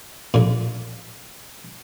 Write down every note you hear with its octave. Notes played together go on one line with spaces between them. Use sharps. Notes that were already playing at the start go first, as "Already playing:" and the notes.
A#1 A#2